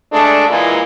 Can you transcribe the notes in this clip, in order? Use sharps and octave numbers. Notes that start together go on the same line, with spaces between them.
G#3 A3 D4
A#2 E3 G#3 A#3